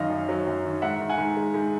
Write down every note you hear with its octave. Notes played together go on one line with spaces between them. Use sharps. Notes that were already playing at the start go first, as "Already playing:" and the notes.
Already playing: F#2 D#3 D#5 F5
F#2
F#3
F#2
D#3
G#2 E5 F#5
D#3
F#5 G#5
G#2
G#3
G#2